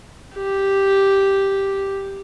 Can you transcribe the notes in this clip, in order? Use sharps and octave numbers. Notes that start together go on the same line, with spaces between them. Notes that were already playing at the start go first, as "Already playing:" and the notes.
G4